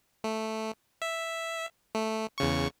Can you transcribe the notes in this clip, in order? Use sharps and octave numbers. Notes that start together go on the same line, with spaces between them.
A3
E5
A3
E2 C#3 C#6